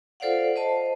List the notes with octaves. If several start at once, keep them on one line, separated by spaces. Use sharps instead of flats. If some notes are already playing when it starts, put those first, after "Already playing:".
F4 A4 C5 D5 F5 F#5
C5 D#5 A5